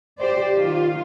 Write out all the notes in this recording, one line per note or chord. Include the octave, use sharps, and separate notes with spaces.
G4 C5 D5
D#3 F4